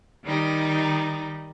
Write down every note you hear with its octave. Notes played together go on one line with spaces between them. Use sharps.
D#3 G3 D#4